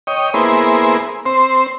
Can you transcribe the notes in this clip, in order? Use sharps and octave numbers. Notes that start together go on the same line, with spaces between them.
C#5 D#5 G5
A#3 B3 E4 G#4 C5
C4 C5